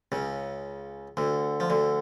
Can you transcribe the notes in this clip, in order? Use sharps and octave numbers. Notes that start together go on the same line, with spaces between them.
C#2 C#3
D2 D3
F3
D2 D3